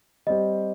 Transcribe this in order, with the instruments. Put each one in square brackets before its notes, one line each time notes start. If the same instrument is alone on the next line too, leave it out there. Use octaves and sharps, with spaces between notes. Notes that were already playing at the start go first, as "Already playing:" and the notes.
[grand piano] G3 C4 G4 [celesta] D#5